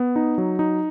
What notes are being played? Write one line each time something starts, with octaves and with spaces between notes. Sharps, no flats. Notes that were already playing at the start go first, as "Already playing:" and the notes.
Already playing: B3
D#4
F#3
D#4